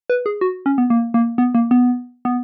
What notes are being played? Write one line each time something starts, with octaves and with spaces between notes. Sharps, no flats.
B4
G#4
F#4
C#4
B3
A#3
A#3
B3
A#3
B3
B3